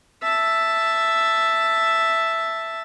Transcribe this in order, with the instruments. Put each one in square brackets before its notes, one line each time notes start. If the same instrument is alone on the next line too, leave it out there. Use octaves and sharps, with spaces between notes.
[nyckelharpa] E5 A5